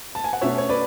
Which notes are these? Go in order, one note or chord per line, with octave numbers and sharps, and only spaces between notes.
A5
G#5
F#5
B2 A3 C#4 C#5 E5
C#5
B4 D5